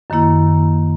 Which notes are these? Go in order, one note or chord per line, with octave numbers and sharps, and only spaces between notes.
F#2 D#3 A#3 E4